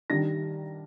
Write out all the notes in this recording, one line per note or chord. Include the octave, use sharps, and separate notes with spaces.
D#3 G3 D4 A#6